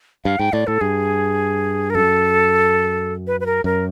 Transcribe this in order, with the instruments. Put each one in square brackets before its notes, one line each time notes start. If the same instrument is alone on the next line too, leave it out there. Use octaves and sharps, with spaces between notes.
[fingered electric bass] G2 [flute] F5
[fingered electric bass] G#2 [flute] G5
[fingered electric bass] A2 [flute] D5
[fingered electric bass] A2 [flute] A4
[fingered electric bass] G2 [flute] G#4
[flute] A#4
[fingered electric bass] F#2 [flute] A4
[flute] B4
B4
A#4
[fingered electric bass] F#2 [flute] A#4